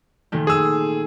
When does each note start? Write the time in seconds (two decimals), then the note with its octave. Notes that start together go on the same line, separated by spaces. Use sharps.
0.32 A#2 D#3 A3
0.47 G#4 E6